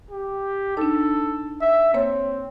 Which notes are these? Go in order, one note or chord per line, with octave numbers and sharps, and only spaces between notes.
G4
D4 D#4 A4
E5
A#3 C4 C#5